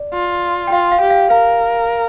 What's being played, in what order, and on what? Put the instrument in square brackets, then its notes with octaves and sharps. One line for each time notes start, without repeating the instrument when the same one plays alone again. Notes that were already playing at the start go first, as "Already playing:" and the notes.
Already playing: [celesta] D5
[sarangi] F4
[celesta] G5
[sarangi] F4 [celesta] F5
[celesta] F5
[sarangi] G4
[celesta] F5
[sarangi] A#4 [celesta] F5